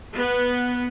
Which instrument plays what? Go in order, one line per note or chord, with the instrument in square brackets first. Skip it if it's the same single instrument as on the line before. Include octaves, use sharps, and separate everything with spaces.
[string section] B3